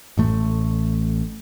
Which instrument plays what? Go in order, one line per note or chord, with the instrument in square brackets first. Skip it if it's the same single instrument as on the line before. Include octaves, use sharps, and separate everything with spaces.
[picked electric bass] A1 A2 A3